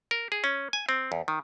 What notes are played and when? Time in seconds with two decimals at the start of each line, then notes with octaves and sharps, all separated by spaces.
0.11 A#4
0.32 G#4
0.44 C#4
0.73 G#5
0.89 C4
1.12 E2
1.28 D#3